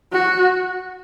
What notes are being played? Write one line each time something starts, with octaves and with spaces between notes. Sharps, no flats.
F#4